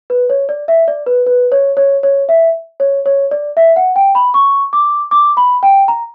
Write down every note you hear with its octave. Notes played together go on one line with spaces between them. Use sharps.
B4
C#5
D5
E5
D5
B4
B4
C#5
C#5
C#5
E5
C#5
C#5
D5
E5
F#5
G5
B5
C#6
D6
D6
B5
G5
A#5